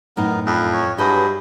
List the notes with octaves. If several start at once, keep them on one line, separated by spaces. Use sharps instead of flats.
F#2 A2 B3 D#4 A#4
F2 E4
C#5
G2 F#3 E4 G#4 B4 D#5